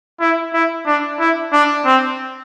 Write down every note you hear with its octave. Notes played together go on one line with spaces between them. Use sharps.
E4
E4
D4
E4
D4
C4